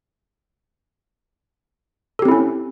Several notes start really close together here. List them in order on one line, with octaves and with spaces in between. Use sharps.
A4 G4 C4 E4 C#4